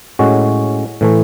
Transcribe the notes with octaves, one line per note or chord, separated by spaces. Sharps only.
A2 G#3 C#4 F#4
A2 E3 A3